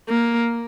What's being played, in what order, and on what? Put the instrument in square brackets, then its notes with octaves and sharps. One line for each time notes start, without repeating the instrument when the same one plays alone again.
[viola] A#3